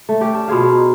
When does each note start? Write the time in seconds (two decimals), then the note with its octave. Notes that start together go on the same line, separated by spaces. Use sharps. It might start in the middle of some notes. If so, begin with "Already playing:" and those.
0.09 A3
0.21 C#4 G4
0.34 D4
0.48 B2 F4 G#4 F5
0.69 D#4